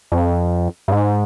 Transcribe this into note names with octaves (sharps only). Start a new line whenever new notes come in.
F2
G2
G#2